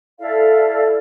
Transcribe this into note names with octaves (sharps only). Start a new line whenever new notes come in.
E4 A4 D5 F5